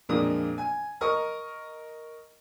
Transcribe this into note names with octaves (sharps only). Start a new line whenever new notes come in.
F2 A#2 G#3 A#3 D4 D#6
G#5
A#4 D#5 A#5 C#6 D#6 F6